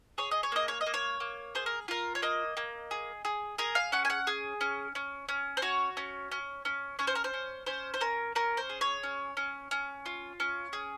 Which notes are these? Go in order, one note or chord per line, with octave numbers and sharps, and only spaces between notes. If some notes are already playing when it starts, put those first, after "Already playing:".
G#4 C#5
D#5
C#5
A#3 D#5
C#5
D#5
A#3
C#5
A#3
G#4 C5
A#4
F4 A#4
C#5
A#3 D#5
A#3
G#4
G#4
G#4 A#4
F5
C#4 F#5
G#5
F#5
G#4
C#4
C#4
C#4
C5
F#4 C#5
C#4
C#4
C#4
C#4 C#5
C5
A#4
C5
C#4
C#4 C5
C5
C#4 A#4
C#4 A#4
C5
G#4
C#5
C#4
C#4
C#4
F4
C#4
G#4